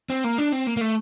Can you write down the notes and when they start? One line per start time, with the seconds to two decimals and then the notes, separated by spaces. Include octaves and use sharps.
0.10 C4
0.24 A#3
0.38 D4
0.52 C4
0.67 A#3
0.77 A#3
0.81 A3